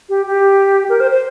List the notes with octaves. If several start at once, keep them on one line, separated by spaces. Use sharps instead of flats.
G4
G4
A#4
C5
C5